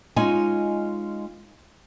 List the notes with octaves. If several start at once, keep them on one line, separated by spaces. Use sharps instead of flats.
G#3 C#4 D#4 F4 G#5